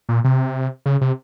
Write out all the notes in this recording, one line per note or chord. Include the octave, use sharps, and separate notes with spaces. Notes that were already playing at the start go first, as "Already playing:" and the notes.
A#2
C3
C#3
C3